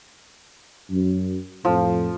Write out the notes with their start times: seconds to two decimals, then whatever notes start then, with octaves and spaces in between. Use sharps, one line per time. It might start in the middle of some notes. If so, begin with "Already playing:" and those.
0.90 F#2
1.65 F2 A2 F3